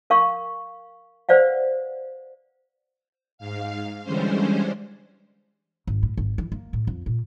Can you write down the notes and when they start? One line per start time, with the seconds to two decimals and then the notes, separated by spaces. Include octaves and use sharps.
0.10 A#4 F5 C#6
1.29 B4 C5 D5 F5 F#5
3.38 G#2 F5
4.03 D3 E3 G3 G#3 C#4 C5
5.87 G#1
6.03 A2
6.17 G#1
6.38 E3
6.52 A#3
6.73 A2
6.87 F2
7.06 A#2